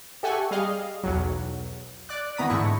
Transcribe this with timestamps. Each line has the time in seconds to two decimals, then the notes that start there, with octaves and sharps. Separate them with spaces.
0.23 G4 A4 E5 F#5 G#5 C#6
0.51 G3 G#4 D#5 F5
1.04 B1 E2 F#3
2.09 D5 D6 F#6
2.37 D#3 E3 B3 A#5 D#6 B6
2.49 G#2 D3 A3 E4 C#6